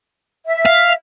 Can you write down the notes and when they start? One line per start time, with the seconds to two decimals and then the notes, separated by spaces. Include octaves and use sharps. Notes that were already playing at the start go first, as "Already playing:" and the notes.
0.45 E5
0.66 F5